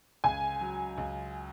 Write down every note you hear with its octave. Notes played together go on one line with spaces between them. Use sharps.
C#2 G#5
F#3
C#2